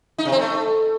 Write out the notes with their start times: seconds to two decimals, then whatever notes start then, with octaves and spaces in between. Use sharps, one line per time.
0.18 D#4
0.25 C3
0.32 C4
0.39 A3